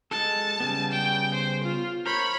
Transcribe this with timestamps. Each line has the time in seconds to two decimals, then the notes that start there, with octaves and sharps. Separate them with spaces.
0.11 G#3 A4 A5
0.60 C#3 G3 B3
0.92 G5
1.34 C5
1.64 F4
2.06 A#4 C5 C#5 B5